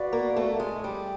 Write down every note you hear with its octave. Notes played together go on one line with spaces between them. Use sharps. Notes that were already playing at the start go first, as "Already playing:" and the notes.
Already playing: F#4 B4 D5 F5
A#3
A3
G#3
G3